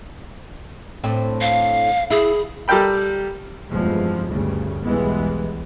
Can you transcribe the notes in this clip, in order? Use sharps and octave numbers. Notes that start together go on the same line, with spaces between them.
A2 C4 D4
F5
E4 G#4
G3 A4 A#4 G5 B5
F1 E2 G2 F3 G#3
D2 G2 C#3 G3
B1 E2 E3 G3 G#3 B3